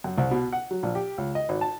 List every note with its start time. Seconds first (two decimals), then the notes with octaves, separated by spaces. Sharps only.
0.04 F#2
0.18 C2
0.31 B2
0.53 F#5
0.71 F#3
0.83 A#1
0.95 G4
1.18 C#2
1.35 D#5
1.49 G#1
1.61 A5